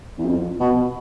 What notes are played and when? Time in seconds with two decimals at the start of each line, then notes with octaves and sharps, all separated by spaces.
0.18 E2
0.25 F2
0.60 B2